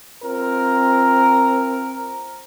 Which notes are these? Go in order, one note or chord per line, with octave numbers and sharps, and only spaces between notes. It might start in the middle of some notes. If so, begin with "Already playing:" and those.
C4 F4 A#4